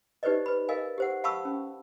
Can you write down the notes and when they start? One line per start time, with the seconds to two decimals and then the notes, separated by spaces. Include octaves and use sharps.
0.23 D#4 G4 B4 C5 D5 D#5
0.46 B4 B5
0.69 A#4 D#5 F5 G#5
0.98 G4 C5 F#5
1.24 F5 A5 B5 C#6 E6
1.45 C#4